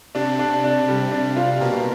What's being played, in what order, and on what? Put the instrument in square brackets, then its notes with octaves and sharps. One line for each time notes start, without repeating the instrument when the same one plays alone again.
[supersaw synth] C3 [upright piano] D4
[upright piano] D4
D4
G3
D4
F4
[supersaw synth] B2 [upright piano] A#3